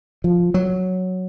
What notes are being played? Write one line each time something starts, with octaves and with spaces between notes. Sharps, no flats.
F3
F#3